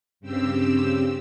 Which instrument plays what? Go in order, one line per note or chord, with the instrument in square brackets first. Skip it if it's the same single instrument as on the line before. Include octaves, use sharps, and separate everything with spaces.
[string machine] G2 C#3 C4 G4 E6